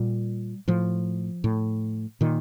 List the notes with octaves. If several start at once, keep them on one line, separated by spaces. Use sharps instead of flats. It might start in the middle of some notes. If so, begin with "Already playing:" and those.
Already playing: A#2 G3
A2 F3
A2
A#2 D#3